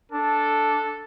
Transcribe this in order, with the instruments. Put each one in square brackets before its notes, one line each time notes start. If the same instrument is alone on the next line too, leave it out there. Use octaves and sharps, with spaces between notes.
[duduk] D4 [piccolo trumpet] A4